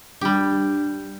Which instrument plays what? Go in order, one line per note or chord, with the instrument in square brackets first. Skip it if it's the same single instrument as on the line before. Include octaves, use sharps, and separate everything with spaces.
[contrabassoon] G2 [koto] G3 G4